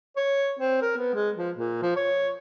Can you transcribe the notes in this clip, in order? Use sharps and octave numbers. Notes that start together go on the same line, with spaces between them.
C#5
C4
A#4
B3
G#3
F3
A#2
F3
C#5